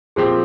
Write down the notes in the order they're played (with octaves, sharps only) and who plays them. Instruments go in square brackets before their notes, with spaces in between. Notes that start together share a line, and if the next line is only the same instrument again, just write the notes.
[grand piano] A#2 F3 C4 G4 [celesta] G#4